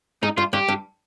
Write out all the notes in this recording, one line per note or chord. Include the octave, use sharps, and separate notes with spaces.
G#2 D#4
G2 F4
G2 G4
G2